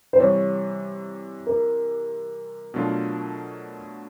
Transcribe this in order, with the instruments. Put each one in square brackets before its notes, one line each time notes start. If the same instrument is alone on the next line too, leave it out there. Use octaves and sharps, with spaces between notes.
[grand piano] C5
[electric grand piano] C3 E3 G3 [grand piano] C#5
[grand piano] A#4
[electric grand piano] B2 F#3 A3 D4 F4